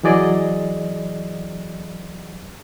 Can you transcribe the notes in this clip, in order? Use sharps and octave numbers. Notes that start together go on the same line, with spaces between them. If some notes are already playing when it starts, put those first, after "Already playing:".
E3 F#3 G#4 D5 D#5